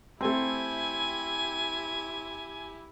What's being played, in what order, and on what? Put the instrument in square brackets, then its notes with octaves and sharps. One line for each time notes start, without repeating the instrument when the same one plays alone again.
[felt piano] A3 C4 [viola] E4 G4 [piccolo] G#5